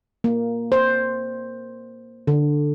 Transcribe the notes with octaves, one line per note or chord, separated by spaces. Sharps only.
A#3
C5
D3